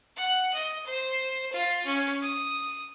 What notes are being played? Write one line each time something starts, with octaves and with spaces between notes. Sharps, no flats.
F#5
D#5
C5
F4
C#4
D#6